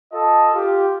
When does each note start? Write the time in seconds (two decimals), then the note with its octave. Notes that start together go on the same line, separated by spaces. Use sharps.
0.12 F4 A4 D#5 A5
0.54 F4 G4